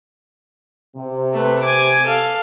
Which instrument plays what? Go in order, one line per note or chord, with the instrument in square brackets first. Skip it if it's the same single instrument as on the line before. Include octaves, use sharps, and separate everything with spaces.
[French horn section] C3
[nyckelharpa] A3 B4
G#5 D6
A4 F5